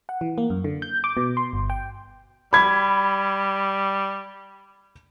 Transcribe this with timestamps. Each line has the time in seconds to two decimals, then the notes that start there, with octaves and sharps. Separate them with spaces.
0.09 F#5
0.21 E3
0.38 A#3
0.50 F#2
0.64 D3
0.82 G6
1.04 D6
1.17 B2
1.37 C6
1.53 G1
1.70 G5
2.53 G3 B5 G#6